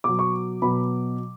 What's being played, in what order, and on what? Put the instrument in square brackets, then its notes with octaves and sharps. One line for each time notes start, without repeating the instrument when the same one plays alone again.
[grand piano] B2 F#3 D6
C#6
B2 F#3 B5